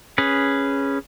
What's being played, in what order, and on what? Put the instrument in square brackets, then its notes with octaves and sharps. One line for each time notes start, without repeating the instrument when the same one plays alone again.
[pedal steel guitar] C#4 G#4 B4